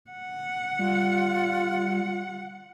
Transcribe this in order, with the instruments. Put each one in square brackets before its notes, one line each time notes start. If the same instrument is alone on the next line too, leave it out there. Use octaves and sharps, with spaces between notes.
[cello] F#5
[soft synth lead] G3 [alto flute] F4